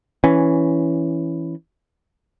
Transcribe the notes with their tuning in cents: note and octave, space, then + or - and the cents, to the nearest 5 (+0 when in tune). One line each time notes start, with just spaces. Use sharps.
E3 +0 C#4 +0